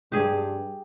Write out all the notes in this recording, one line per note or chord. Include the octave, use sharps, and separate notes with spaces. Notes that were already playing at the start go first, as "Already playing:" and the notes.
G2 G4 G#4